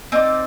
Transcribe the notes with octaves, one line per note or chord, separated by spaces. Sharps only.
C4 D#4 A#4 D5